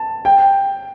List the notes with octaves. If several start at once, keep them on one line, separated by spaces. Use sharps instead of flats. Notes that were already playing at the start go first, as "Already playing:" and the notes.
Already playing: A5
G5